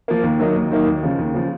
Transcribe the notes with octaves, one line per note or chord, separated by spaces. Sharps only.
F3 A#3
D#2
D#3 F#3 A#3 D#4
D#2
D#3 F#3 A#3 D#4
D#2
C#3 F3
D#2
C#3 F3